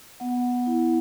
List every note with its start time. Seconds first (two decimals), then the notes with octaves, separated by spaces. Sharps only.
0.20 B3 F#5
0.67 E4